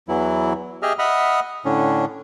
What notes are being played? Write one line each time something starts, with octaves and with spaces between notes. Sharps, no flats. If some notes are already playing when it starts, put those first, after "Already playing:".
E2 E3 F#3 E4
G4 G#4 D#5 E5 F6
D#5 E5 F#5 B5 D#6 F6
A2 D3 C#4 D4